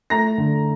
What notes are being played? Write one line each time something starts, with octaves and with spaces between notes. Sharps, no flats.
A3 A#5 A#6
D3